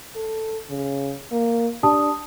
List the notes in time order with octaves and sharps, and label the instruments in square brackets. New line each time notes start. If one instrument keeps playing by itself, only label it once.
[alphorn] A4
C#3
A#3
[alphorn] D4 [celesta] G4 A5 D#6